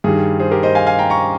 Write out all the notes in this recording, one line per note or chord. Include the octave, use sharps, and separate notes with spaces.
G2 D#3 G3 G#4
G#4 C5
G4 A#4
C5 D#5
F5 G#5
F5 G#5
G5 A#5
A#5 C#6